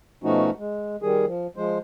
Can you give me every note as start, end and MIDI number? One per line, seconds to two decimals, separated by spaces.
0.24 0.50 47
0.24 0.50 53
0.24 0.50 57
0.24 0.50 61
0.24 0.50 63
0.24 0.50 66
0.58 0.96 56
1.02 1.26 51
1.02 1.26 55
1.02 1.26 68
1.27 1.47 53
1.56 1.78 53
1.56 1.78 56
1.56 1.78 72